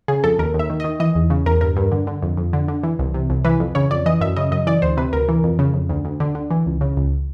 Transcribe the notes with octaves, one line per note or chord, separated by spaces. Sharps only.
C#3 G#4
F2 A4
D#2 A#4
D#2
E5
D#3
D#5
D#3
E3 D#5
E2
C#3
E2 A#4
G2 A#4
G2
D3
D3
F2
F2
D3
D3
E3
C2
C3
C2
E3 B4
F2
C#3 C#5
F2 D5
E3 D#5
F#2 E5
C#3 D#5
F#2 D#5
E3 D5
D2 C5
C3 B4
D2 A#4
E3
F2
C#3
F2
D2
D2
D3
D3
E3
C#2
C#3
C#2